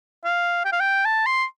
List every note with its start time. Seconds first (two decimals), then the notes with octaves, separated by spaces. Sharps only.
0.25 F5
0.65 G5
0.72 F5
0.80 G5
1.05 A5
1.26 C6